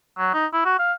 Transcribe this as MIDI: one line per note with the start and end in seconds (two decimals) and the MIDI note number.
0.18 0.30 54
0.34 0.46 63
0.53 0.63 64
0.65 0.75 66
0.79 0.93 77